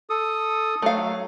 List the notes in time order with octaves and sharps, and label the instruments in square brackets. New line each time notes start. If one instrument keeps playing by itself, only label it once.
[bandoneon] A4 D#6
[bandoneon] F#3 [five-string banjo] A3 F5